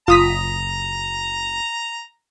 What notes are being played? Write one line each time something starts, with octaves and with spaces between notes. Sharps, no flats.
F#1 F4 A#5 D#6 B6